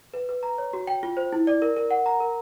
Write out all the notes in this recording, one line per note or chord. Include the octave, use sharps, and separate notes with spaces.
B4
B4
A#5
C#5
F#4
G5
F4
C5
E4
D5
A#4
A#4
F#5
A#5
A#4